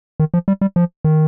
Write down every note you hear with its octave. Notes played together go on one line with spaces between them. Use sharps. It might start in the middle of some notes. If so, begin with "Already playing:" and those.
D#3
F3
G3
G3
F3
D#3